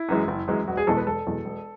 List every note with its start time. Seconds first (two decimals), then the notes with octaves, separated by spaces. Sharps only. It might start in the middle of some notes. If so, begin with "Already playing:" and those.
Already playing: E4
0.09 F#2 E3 G#3
0.28 F#1
0.48 F#2 E3 G#3
0.67 E1 F#4
0.77 G#4
0.87 E2 B2 G#3 A4
0.97 B4
1.07 E1 A4
1.27 E2 B2 G#3
1.45 E1